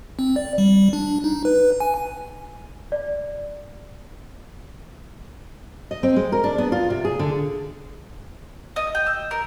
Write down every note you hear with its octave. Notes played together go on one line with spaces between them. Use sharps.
C4
D5
G3
D4
D#4
B4
G#5
D5
D#5
C4
G#3
A#4
D4
B3
F4
C3
G#4
D3
D#5
G5
E6
A#4